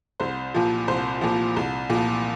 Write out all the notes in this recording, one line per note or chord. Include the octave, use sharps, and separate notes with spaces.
C2 C5
A#2 F3
C2 C5
A#2 F3
C2
A#2 F3